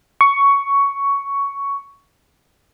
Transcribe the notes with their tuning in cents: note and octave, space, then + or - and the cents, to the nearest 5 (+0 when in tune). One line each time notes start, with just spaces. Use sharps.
C#6 +10